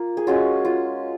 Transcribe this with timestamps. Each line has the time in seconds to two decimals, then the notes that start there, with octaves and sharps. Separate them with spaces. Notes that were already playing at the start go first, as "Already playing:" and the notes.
Already playing: A#3 F4
0.17 G#4
0.27 G#3 C#4 F4 F#4
0.65 F4